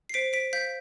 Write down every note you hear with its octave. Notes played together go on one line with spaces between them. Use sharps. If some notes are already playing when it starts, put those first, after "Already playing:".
C7
C5 B6 D7
B6 D7
F5 G6 B6